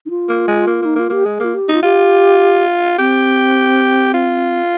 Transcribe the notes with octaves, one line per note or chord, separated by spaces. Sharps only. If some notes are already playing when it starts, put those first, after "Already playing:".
D#4
F4
A#3
G#3
A#3
A#3 D#4
A#3 F4
A#3 G4
G#3 G#4
A#3 F4
G4
D#4 F4
F4 G4
C4 G4
F4